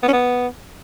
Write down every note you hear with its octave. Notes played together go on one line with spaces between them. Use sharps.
B3
C#4
B3